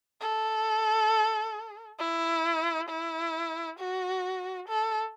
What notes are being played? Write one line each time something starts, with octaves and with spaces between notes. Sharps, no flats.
A4
E4
E4
F#4
A4